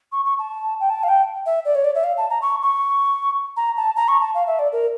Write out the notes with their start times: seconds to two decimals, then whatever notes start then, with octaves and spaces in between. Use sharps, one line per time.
0.12 C#6
0.25 C#6
0.39 A5
0.80 G5
0.89 A5
1.03 F5
1.08 G5
1.46 E5
1.65 D5
1.75 C#5
1.84 D5
1.95 E5
2.04 F5
2.17 A5
2.30 A#5
2.42 C#6
2.62 C#6
3.57 A#5
3.77 A5
3.96 A#5
4.08 C#6
4.21 A5
4.34 F5
4.47 E5
4.59 D5
4.72 A#4